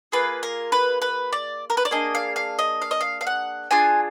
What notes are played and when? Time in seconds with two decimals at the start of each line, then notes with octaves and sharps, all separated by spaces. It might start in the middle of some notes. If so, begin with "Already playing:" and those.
0.12 A#3 F4 G#4 B4
0.43 A#4
0.72 B4
1.02 B4
1.33 D5
1.70 A#4
1.77 B4
1.85 D5
1.91 A#3 D4 G#4 D#5
2.15 F5
2.36 F5
2.59 D#5
2.82 F5
2.91 D#5
3.01 F5
3.21 F5
3.27 F#5
3.71 D4 F4 G#4 G#5